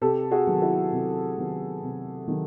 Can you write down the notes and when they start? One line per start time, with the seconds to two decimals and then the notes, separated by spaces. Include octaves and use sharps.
0.01 C3 G4 A4
0.31 F#4 G#4
0.47 D#3 F#3 B3
0.62 E4 F#4
0.92 C3
1.37 D#3 F#3 B3
1.82 C3
2.27 D#3 F#3